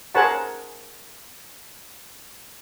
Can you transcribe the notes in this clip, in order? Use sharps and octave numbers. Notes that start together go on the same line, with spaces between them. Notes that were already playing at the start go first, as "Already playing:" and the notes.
G#4 A#4 C5 C#5 F#5 A5